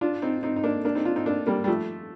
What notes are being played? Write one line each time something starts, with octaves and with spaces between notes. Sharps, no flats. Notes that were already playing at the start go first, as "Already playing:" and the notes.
D4 F4
C4 D#4
C4 D#4
D#4
A#3 D4
A#3 D4
C4 D#4
D4 F4
C4 D#4
A#3 D4
G3 A#3
G3
F3 A3